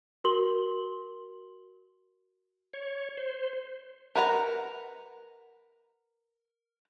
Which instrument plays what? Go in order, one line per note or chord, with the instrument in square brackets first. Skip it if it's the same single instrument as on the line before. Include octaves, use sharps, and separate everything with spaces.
[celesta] F#4 A#4 C6 F#7 G7
[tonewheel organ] C#5
C5
[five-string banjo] A#4 B4 F#5 A5 A#5